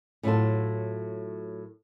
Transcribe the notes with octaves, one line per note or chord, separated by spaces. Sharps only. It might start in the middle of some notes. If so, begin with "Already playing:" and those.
A2 F#3 F4 A4